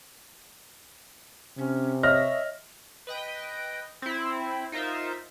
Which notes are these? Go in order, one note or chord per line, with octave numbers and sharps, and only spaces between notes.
C3 C#4
C#5 D#5 E5 F6 A#6
B4 D#5 G5
C4 E4
D#4 F4 A#4 C5 E5